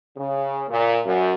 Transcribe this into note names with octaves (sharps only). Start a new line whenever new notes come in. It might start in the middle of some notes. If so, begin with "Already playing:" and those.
C#3
A#2
F#2